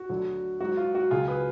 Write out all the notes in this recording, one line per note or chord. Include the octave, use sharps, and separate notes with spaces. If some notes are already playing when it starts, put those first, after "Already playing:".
Already playing: F#4
D2 D3 F#3
G#2 F#3 F#4
F4
F#4
C#2 C#3 F#3 F4 G#4
G#4 B4